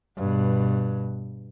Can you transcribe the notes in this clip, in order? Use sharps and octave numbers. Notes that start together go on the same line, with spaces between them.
G2 B2